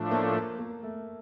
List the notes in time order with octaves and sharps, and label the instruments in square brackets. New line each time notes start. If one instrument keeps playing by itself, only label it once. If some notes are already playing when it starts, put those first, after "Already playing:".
Already playing: [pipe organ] A2 F3 A3 D4
[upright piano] A#3
A#3
A3